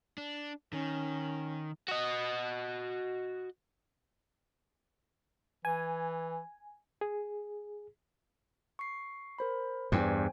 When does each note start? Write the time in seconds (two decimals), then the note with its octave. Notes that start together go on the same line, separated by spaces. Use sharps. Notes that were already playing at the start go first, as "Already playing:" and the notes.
0.18 D4
0.73 D#3 C#4
1.88 F#4 D#5
5.65 E3 G#5
7.01 G#4
8.79 C#6 C7
9.39 A#4 C5 B5
9.92 E2 G2 C5 G5 G#5